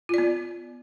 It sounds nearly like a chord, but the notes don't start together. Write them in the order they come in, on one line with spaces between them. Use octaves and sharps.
F4 D5 B3